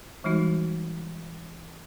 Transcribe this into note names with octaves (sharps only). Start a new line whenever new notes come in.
E3 G3 G#3 D#4 F#4